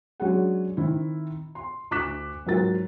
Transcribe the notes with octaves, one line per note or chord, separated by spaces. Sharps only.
F#3 G#3 C#4 D4 G#4 F#5
D#3 C4 E4
C6
D2 C#6 D6 F#6 B6 E7
G#2 F3 F#3 A#4 A6